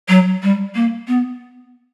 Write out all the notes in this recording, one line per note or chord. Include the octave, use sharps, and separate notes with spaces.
F#3
G3
A#3
B3